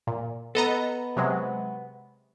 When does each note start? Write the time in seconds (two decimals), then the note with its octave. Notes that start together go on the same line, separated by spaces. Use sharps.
0.07 A#2
0.55 B3 A4 B4 D#5 A#5
1.17 C3 F#3 G#3